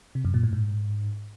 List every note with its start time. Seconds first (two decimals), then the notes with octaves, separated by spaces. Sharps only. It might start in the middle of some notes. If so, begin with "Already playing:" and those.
0.15 C3
0.25 F#2
0.34 A#2
0.43 A2
0.53 G#2